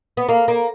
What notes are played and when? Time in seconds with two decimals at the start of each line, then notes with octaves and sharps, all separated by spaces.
0.17 B3
0.29 A#3
0.48 A#3